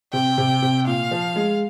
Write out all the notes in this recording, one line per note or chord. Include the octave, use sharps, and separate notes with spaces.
C3 G5
C3
C3
A#2 F5
F3
G#3